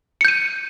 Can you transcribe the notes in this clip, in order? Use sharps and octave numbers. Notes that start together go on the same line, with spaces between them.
G6 C#7 D#7